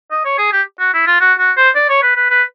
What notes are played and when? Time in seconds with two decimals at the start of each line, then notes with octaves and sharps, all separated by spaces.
0.11 D#5
0.25 C#5
0.38 G#4
0.52 G4
0.79 F#4
0.93 E4
1.07 F4
1.20 F#4
1.39 F#4
1.57 C5
1.75 D5
1.89 C#5
2.03 B4
2.16 B4
2.30 B4